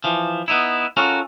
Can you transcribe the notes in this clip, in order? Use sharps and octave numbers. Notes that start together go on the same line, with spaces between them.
E3 F3
B3 D#4 E4
C#4 F4 F#4 A4 A#4